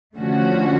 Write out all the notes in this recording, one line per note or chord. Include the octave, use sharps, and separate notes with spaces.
D3 F3 A3 C#4 F#4